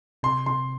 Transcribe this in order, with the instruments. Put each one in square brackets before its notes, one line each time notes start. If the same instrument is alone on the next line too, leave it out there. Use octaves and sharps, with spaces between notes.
[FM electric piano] C3 [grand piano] C6
[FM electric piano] C3 [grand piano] C6